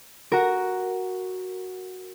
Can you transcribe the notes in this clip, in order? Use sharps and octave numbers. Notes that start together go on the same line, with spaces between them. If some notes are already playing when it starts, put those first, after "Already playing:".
F#4 A#4